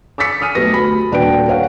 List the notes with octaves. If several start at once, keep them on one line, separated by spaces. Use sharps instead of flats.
D6 E6 A6 B6 C#7
G#5 D#6 F6 D#7
B1 A3 G4 B4 A#6
D2 B5
D#1 D4 F#4 B4 G5 D7
B4 C#5 F5 F#5